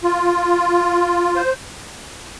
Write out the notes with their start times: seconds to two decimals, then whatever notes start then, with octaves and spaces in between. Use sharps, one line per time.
0.04 F4
1.36 C5